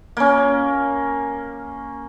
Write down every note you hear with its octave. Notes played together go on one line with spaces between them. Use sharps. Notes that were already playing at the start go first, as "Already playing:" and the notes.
A#3 C#4